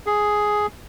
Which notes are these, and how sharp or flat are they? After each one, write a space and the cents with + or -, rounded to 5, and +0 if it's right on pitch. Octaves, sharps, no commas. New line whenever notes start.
G#4 +5